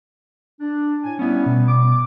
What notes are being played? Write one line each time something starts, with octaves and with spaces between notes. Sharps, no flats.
D4
A2 G#5
G3 B3 C#4 E4
B2
D6